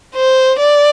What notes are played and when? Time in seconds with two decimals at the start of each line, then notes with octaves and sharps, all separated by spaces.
0.15 C5
0.59 D5